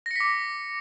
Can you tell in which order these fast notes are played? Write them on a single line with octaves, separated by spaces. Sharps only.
A#6 C#7 B6 D6